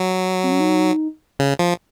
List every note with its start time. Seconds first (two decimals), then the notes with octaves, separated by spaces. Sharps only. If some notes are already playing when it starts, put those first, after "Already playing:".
Already playing: F#3
0.44 C4
0.52 C#4
0.60 D#4
1.39 C#3
1.59 F3